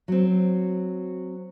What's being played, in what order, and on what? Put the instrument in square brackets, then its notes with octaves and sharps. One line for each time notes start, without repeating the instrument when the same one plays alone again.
[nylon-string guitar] F#3 C4